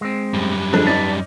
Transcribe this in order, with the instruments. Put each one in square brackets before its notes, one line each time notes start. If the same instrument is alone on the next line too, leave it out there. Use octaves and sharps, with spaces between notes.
[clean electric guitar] G#3 C4
[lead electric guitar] F#2 G3
[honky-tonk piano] D3 F3 G#3 [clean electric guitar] D4
[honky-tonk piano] C#4 D#4 D5 [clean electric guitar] B4 A5